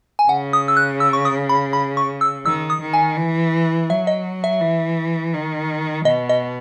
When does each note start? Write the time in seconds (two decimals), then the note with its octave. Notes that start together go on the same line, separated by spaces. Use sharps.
0.19 G#5
0.28 C#3 F#5
0.53 D#6
0.68 E6
0.77 F#6
1.00 E6
1.13 C#6
1.25 D#6
1.49 B5
1.73 B5
1.97 C#6
2.21 E6
2.45 D#3 E6
2.70 D#6
2.81 D#3
2.93 G#5
3.17 E3
3.90 F#3 E5
4.07 D#5
4.44 E5
4.61 E3
5.34 D#3
6.05 B2 D#5
6.29 D#5